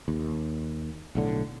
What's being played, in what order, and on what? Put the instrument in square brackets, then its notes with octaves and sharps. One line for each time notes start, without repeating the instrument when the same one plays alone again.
[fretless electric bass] D#2
B1 A2 D3